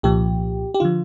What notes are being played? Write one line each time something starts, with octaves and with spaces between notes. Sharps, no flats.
C2 A#2 F3 G4
G4
D3 F3 F4